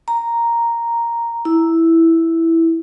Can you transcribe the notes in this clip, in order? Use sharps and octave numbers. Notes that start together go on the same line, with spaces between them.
A#5
E4